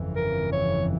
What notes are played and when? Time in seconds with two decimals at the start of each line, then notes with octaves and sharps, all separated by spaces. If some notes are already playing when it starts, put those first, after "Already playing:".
Already playing: G1 F2 C#3 E3
0.16 A#4
0.52 C#5